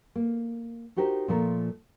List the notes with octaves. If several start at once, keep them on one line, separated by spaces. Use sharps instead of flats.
A#3
D#4 F#4 G4 A#4 C5 D#5
A#2 F3 A3 A#4